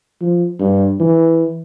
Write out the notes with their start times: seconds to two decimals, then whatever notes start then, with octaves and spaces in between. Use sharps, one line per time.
0.21 F3
0.60 G2
1.00 E3